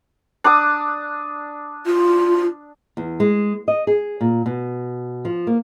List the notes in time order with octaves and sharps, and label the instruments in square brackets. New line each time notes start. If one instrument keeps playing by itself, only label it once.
[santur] D4 D6 D#6
[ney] F4
[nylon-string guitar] E2
G#3
D#5
G#4
A#2
B2
F3
A#3